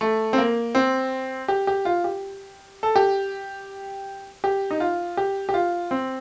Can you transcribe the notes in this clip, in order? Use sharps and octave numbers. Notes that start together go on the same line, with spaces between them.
A3
C4
A#3
C4
G4
G4
F4
G4
A4
G4
G4
D#4
F4
G4
G4
F4
C4